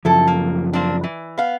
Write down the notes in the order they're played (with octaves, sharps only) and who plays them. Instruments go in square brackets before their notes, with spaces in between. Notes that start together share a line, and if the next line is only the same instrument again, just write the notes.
[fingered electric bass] F#2 C#3 F3 [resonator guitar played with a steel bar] E4 A4
[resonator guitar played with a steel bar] A#3
A#3 C4 D4
E3
B3 F5